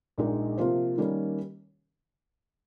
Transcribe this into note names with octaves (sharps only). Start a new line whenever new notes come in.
A#1 A#2 G#3 D#4 A#4
C3 F3 A#3 F4 C5
D#3 G3 A#3 C#4